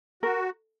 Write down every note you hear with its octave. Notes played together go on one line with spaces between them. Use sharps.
F#4 A#4